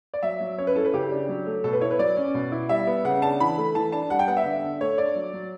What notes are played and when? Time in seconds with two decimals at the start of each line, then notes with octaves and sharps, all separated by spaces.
0.14 D5
0.23 F#3 E5
0.41 F#3
0.58 C#4 C#5
0.67 B4
0.76 E4 A4
0.85 B4
0.93 C#3 G4
1.11 D4
1.29 F#3
1.47 A3
1.64 B2 A4
1.73 B4
1.81 E4 C#5
1.91 B4
1.99 F#3 D5
2.17 C#4
2.34 B2
2.52 E4
2.69 G3 E5
2.87 B3
3.05 C#3 F#5
3.22 D4 A5
3.40 E3 B5
3.58 A3
3.75 E3 A5
3.92 D4 A5
4.10 G3 F#5
4.19 G5
4.28 B3 F#5
4.37 E5
4.45 D3
4.63 D3
4.81 A3 C#5
4.98 D4 D5
5.16 F#3
5.34 F#3